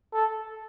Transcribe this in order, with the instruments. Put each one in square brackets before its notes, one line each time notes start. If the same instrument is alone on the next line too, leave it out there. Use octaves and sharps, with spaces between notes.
[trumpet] A4